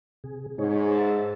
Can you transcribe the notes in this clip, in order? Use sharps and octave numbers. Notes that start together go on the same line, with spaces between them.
C3 G#4
G#2 D#4 G#4 C#5
E5 A5